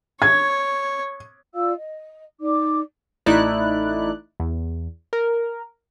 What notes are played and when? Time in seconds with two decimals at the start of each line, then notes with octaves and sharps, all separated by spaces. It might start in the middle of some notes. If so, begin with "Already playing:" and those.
0.22 C#5 G#6
1.53 F4 D5 F5 E6
1.77 D#5
2.41 D#4 D5 D6
3.26 A1 A3 D#4 E4 D5 F#6
4.40 E2
5.13 A#4